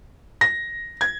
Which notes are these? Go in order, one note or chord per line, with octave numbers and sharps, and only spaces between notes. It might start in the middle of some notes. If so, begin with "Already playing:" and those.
A#6
G#6